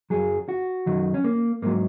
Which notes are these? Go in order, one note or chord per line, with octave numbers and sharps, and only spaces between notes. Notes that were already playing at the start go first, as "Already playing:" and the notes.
F#2 F#3 G#4
F#4
F#2 D#3 F#3
C#4
A#3
G#2 F#3 A#3